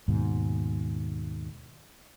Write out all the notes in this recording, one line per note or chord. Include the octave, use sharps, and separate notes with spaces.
D#2 G#2 B2